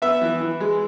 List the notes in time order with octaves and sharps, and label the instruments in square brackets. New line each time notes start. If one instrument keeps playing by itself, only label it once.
[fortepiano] B3 E5
E3
E3
G#3